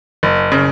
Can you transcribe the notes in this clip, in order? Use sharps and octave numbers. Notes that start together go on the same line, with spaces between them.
F#1
C#3